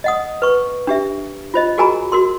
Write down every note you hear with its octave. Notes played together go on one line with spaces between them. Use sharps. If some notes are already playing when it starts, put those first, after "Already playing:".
D#5 F#5 D#6
B4 C#6
D4 G4 E5
F4 C5 D#5
F#4 G#4 A#4 G#5 A#5 B5
F#4 A#4 C6